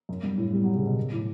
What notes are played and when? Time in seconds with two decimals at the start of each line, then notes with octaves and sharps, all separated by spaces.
0.09 F#2
0.23 G2
0.38 A2
0.53 G3
0.64 F#3
0.75 C#3
0.86 B2
1.12 A2